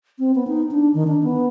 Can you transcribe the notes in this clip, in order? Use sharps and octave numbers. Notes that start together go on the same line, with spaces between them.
C4
B3
D#4
D4
D#3
D4
B3